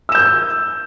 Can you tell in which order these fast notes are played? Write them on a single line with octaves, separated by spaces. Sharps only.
E6 E7 G6